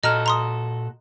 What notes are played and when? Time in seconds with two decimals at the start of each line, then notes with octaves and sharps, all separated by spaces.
0.04 A#2 F#4 A4 D#5 A#5 F6
0.26 A#5 C6 D#6